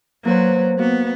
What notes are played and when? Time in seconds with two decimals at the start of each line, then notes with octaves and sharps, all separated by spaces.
0.25 F#3 A#3 B4 C5
0.79 A#3 B3 F#4